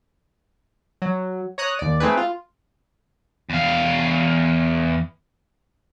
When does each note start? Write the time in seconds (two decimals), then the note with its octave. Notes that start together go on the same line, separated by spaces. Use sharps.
1.02 F#3
1.58 C#5 A#5 D#6 F#6
1.79 D#2 D5
2.00 A3 C4 D#4 G#4 B4
2.17 F4
3.50 E2 F5